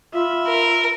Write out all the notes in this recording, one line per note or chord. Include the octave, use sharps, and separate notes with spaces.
F4 E5 B5
A#4